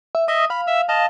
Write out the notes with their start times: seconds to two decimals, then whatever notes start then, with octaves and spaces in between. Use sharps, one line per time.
0.15 E5
0.28 D#5 E5 D#6
0.50 F5 B5
0.67 E5 E6
0.89 D#5 F5 A5